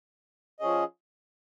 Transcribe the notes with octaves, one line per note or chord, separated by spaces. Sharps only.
F3 C#4 G#4 D#5